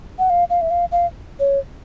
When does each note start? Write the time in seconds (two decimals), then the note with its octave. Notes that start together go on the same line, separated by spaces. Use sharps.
0.19 F#5
0.30 F5
0.50 F5
0.61 E5
0.70 F5
0.92 F5
1.39 C#5